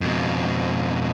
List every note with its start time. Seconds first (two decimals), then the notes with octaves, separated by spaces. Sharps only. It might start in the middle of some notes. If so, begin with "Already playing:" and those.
0.01 F2 B2